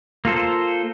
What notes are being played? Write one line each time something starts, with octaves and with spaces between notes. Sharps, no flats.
A#3 F4 A4 C5